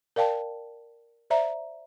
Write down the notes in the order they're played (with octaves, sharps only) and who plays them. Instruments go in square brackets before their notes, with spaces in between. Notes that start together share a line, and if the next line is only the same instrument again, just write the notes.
[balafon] A#4 D5 F5 G5 A5
C5 D5 E5 A#5